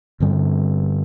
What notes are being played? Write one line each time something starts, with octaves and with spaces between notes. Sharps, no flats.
G2 D3 G3 C4